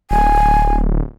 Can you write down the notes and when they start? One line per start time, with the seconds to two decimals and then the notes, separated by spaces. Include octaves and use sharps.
0.11 D1 G#5